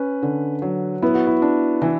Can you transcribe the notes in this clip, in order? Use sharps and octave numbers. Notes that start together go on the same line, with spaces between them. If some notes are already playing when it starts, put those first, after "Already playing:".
Already playing: C#4 B4
D3
F#3
B3 E4
F#4
E4
D4
E3 E4